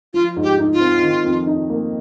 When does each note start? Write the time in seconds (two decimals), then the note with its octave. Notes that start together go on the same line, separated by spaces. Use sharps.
0.14 F3 F4
0.36 G#2
0.43 G4
0.58 D#4
0.73 F4
0.81 C4
1.03 D#3
1.25 F2
1.47 D#4
1.69 A#3